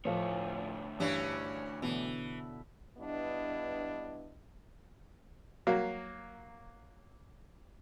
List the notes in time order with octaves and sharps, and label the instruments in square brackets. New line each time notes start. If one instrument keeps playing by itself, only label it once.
[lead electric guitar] D2 C#5 [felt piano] A2 F3
[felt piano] G2 [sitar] E3 C#4 D4
[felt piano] B2 D3 [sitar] E3
[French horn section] G2 B3 D4 E4 D#5
[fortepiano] F#3 A#3